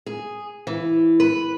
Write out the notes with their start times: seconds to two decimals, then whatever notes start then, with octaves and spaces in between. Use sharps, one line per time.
0.06 G#4
0.67 E3
1.20 B4